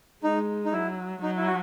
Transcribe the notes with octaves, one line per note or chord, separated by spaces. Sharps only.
G#3 D#4
D#4
F#3 E4
F#3 D#4
E4
F#4